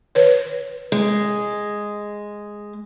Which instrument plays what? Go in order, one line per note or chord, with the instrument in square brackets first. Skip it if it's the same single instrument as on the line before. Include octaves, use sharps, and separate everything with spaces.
[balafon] B4 C#5
[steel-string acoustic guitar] G#3